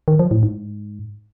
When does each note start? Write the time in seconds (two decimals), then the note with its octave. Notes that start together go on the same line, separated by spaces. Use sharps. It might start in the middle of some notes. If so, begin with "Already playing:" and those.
0.08 D#3
0.19 F3
0.31 A2
0.43 G#2